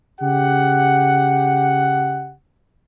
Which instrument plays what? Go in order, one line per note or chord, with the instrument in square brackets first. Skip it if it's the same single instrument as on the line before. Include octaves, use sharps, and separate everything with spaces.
[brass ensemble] C#3 G4 F#5